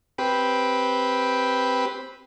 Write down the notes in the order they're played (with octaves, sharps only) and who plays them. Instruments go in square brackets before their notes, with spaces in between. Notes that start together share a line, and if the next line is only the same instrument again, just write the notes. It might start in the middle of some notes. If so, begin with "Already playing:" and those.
[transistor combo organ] C4 G4 B4